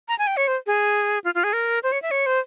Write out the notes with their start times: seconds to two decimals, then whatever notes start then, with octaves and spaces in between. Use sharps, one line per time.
0.08 A#5
0.19 G#5
0.27 G5
0.37 C#5
0.48 C5
0.67 G#4
1.24 F4
1.35 F4
1.44 G#4
1.53 A#4
1.83 C5
1.92 C#5
2.02 E5
2.11 C#5
2.26 C5